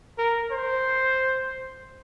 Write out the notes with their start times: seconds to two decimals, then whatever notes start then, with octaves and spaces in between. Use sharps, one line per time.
0.18 A#4
0.51 C5